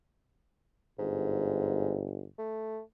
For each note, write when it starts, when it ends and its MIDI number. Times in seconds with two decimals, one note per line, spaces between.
0.99 2.25 31
0.99 2.01 44
2.39 2.80 57